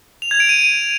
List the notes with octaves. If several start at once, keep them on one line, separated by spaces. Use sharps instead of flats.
F7
G#6
D7
D#7